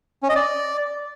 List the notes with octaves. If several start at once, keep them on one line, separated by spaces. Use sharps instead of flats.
C#4
D#5
D5